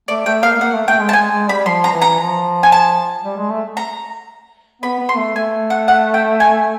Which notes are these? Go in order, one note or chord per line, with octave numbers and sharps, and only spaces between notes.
A3 D5
A3 G5
A#3 F5
A#3 F#5
A3
A3 G5
G#3
A5
G#3 G#5
G#3
G3 B5
F3 C6
A#5
E3
A#5
F3
G#5
A5
G3
G#3
A3
A#5
B3 B5
B3
C6
A3
A3 G#5
F#5
F#5
G5
G#5